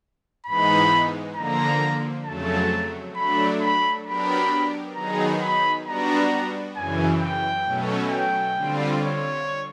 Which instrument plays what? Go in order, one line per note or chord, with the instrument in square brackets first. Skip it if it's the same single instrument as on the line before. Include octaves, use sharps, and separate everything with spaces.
[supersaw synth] G#2 E3 G#3 B3 D#4 [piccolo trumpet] B5
[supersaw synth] D3 F3 A#3 [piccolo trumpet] A#5
[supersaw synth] F2 C#3 F#3 A3 [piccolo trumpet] A5
[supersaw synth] F#3 A3 D4 [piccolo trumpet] B5
[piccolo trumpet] B5
[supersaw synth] F#3 B3 D4 G4 A#4 [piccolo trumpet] B5
[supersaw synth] D#3 F#3 B3 D#4 G#4 [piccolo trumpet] A#5
[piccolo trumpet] B5
[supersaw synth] G3 B3 D4 F#4 [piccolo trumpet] A#5
[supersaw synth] F#2 C#3 E3 [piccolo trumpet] G#5
[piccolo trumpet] G5
[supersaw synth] B2 F#3 A3 C#4
[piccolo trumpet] G5
[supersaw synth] D3 G3 C4 F4
[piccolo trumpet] C#5